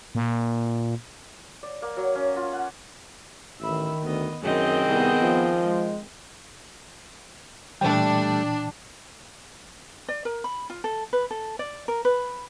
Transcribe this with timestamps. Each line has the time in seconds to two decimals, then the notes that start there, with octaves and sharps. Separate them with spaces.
0.15 A#2
1.63 D5
1.82 A#3
1.97 F#3
2.15 C#4
2.36 F4
2.53 F#5
3.60 A1 D#3 E5 B5
4.03 D2 B3 D#5
4.43 F#2 D#3 C4 G#4 D#5 G5
4.86 C2 B3
5.21 F3
5.59 G#3
7.81 A#2 E3 G3 A3 D4 G5
10.09 D5
10.25 A#4
10.44 B5
10.70 F4
10.84 A4
11.13 B4
11.31 A4
11.59 D5
11.88 A#4
12.05 B4